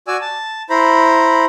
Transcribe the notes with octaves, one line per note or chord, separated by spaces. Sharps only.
F#4 D5 G#5 E6
A5
E4 C5 A#5 B5